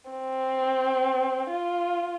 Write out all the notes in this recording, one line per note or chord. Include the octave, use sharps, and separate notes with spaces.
C4
F4